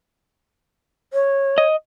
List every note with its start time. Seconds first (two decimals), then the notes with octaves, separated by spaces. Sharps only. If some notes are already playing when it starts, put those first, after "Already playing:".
1.13 C#5
1.58 D#5